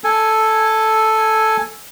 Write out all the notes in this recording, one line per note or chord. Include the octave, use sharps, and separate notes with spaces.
A4 G#5